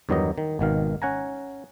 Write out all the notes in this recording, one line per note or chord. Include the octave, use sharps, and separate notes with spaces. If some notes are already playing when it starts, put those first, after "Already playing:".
E2 G2 D#3 F#3 D#4 D#5
D#3
G#1 B2 D#3 F5
C#4 F#5 G#5 A#5